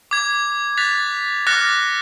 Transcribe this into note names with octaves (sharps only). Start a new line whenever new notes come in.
D6 G#6
F#6 A6 B6 F7
D6 F6 F#6 A6 A#6 C#7